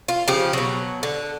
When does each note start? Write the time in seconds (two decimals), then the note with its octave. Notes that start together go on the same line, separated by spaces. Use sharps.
0.08 F4
0.28 C#3 F3 G4
0.53 B2 F#3
1.03 D3